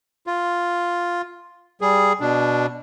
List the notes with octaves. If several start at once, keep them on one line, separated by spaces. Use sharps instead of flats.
F4
G3 G#4
B2 D4